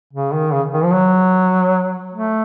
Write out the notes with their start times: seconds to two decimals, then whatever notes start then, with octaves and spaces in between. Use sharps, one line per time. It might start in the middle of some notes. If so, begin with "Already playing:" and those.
0.13 C#3
0.33 D#3
0.53 C#3
0.74 D#3
0.84 F3
0.94 F#3
2.14 A3